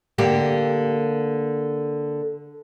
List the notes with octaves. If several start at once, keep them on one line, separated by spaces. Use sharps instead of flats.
D3 A#3 G4